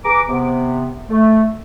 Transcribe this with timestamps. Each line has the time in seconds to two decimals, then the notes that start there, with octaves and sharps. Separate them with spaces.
0.05 B3 G#4 B4 A#5 D6
0.28 C3 B3
1.10 A3